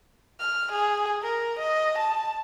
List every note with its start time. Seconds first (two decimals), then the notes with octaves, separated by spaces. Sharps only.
0.40 F6
0.72 G#4
1.22 A#4
1.59 D#5
1.98 A5